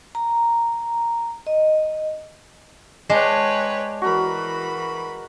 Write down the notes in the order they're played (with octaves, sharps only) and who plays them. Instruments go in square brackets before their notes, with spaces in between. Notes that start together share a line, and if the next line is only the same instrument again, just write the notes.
[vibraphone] A#5
D#5
[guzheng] G#3 [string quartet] B4 C#5 G5 [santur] D5 A5 D6
[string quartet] E3 B5 [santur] F#4 A#4